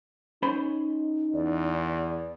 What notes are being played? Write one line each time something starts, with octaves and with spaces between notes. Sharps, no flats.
C#4 D#4 C5 B5
E2 D5